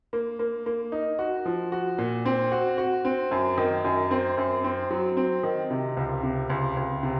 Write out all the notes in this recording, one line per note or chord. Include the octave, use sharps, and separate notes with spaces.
A#3
A#3
A#3
D#4
F#4
F3
F#4
A#2
C4
F#4
F#4
C4
F#2
D#3
F#2
C4
F#2
C4
F#3
C4
D#3
C3
C#2
C3
C#2
C#2
C3